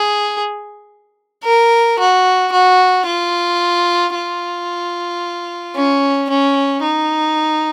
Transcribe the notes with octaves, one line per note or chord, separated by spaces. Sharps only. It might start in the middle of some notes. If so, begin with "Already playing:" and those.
Already playing: G#4
A#4
F#4
F#4
F4
F4
C#4
C#4
D#4